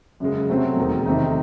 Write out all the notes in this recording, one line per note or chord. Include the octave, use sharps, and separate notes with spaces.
F#2 C#3 G#3
C3 F#3 A3 C4
E1 D#2 D#3 G#3
C3 D#3 A3 D#4